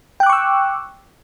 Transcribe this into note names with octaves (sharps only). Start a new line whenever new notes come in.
G5 C#6 D6 E6 F#6